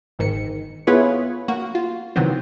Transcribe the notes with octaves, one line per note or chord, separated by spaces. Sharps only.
G1 G#2 D#3 C#7
B3 E4 F4 G#4 B4 C#5
A#3 F#4
F4
C3 D#3 E3 F#3 B3 C4